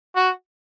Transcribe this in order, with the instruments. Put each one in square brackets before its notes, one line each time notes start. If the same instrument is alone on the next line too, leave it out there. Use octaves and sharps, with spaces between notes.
[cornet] F#4